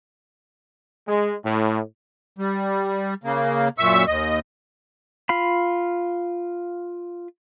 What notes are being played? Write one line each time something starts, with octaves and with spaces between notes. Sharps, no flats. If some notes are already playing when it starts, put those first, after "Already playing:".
G#3
A2
G3
C#3 A#3
F#2 A#2 E5 C#6 E6
D#2 D#5
F4 F5 B5